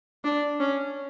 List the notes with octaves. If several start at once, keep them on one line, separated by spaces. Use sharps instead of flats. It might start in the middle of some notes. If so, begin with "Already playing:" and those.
D4
C#4